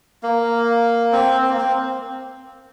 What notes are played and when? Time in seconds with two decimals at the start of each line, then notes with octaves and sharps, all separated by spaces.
0.23 A#3
1.12 C4
1.42 C4
1.49 A#3
1.57 C4